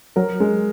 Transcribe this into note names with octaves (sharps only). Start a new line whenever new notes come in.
F#3 A#4
G#3